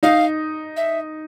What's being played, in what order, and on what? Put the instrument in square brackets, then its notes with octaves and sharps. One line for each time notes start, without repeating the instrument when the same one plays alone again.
[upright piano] D#4 [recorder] F5
[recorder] E5